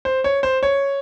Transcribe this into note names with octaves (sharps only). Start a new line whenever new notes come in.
C5
C#5
C5
C#5